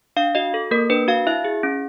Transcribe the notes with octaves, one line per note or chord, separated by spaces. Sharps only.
D4 F5
F#4 D#5
A4
A#3 A#4
D4 B4
F#4 F5
E4 E5
G#4
C#4